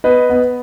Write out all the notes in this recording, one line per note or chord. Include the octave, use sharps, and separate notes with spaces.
B3 B4 D#5
B3